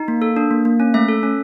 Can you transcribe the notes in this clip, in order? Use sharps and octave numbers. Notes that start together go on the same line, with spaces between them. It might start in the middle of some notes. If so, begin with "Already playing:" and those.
Already playing: D#4
A#3
A4
D4
A#3
A#3
C#4
A3 E5
A4
C#4